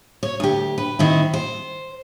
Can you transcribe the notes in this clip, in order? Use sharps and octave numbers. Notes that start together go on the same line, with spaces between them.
C#5
D2 G4
B4
D#3 C4 E4
C5